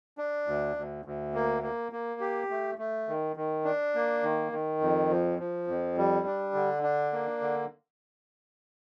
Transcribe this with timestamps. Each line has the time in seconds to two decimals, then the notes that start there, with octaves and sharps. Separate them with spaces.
0.18 D4
0.47 D2
0.76 D2
1.05 D2
1.34 A#3
1.63 A#3
1.92 A#3
2.20 G4
2.50 A3
2.78 A3
3.08 D#3
3.36 D#3
3.65 D4
3.95 A#3
4.23 D#3
4.52 D#3
4.81 F2
5.10 F3
5.39 F3
5.68 F2
5.97 G3
6.26 D4
6.54 D3
6.83 D4
7.12 A#3
7.42 D3